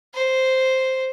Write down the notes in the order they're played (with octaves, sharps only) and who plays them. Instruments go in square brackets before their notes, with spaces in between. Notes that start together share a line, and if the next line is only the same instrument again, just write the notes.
[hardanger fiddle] C5